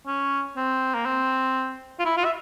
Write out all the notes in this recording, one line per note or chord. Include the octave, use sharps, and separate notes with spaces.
C#4
C4
A#3
C4
F4
E4
F4
E5